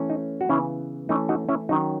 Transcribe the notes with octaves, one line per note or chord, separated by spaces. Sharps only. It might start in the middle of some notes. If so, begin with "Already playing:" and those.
Already playing: E3 A3 C#4
D#4
F#4
C#3 E3 B3 C#4 E4
E3 A3 C#4 D#4
D#4 F#4
C#4 E4
D#3 F#3 C#4 D#4